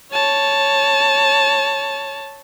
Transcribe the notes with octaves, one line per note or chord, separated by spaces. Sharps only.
C#5 A5